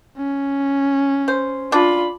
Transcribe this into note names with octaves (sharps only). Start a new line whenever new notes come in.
C#4
C5
D4 F4 B5